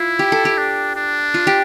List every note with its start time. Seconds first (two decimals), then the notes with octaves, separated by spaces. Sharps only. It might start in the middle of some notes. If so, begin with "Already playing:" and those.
Already playing: E4 F4
0.19 G4
0.32 A4
0.45 G4
0.58 D4
0.96 D4
1.34 F4
1.47 G4